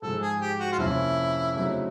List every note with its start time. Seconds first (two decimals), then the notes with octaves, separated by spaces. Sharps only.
0.02 G#2 F3 G#3 A4
0.21 G#4
0.40 G4
0.59 F#4
0.72 F4
0.78 F2 C3 F3 A#3 C#4 E4
1.56 C#3 F#3 A3 C4 D#4